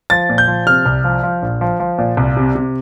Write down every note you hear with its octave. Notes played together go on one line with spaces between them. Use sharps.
F3 A6
A#2
G6
F3
C3 F6
C2
F3
F3
A#1
F3
F3
A#2
C2
C3
C3